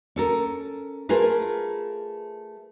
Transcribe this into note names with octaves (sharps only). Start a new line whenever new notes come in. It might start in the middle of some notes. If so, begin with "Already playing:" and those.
C#4 A4 A#4
A3 F4 G#4 A#4 B4